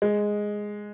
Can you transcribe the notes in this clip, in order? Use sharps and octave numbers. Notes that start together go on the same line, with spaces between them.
G#3